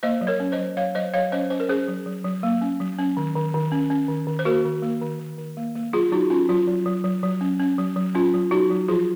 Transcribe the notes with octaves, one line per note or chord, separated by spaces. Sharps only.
A#3 C5 D#5
F#3
A#4 C#5
C#4
C5 D#5
F#3
F#3 C#5 F5
F#3 C5 D#5
F#3 C#5 F5
C#4 C5 D#5
C#4 C5
A#4
C#4 G#4 C5
F#3
F#3
F#3
A#3
C#4
F#3
C#4
D#3
D#3
D#3
C#4
C#4
D#3
D#3
C5
A#3 F#4 A#4
D#3
A#3
D#3
D#3
D#3
A#3
A#3
F#3 F4 G#4
F#3 D#4 F#4
C#4 F4
F#3 F4
F#3
F#3
F#3
F#3
C#4
C#4
F#3
F#3
C#4 F4
F#3
F#3 D#4 F#4
F#3
F3 F4 G#4